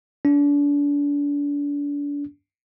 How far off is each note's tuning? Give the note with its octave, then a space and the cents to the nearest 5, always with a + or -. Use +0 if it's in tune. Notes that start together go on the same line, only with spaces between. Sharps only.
D4 -35